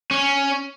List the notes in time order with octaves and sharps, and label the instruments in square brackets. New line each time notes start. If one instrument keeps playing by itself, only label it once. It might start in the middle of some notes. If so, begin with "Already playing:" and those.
[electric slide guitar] C#4